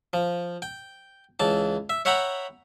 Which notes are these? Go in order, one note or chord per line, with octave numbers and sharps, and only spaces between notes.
F3
G5
C#2 E3 A5
E5
C#5 E5 F#5 G5 A#5 B5